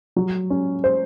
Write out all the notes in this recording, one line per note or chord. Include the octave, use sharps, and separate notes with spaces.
F#3
C#4
C5